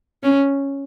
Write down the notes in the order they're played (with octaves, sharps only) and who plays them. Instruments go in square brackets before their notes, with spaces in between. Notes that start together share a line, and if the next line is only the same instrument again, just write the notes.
[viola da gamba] C#4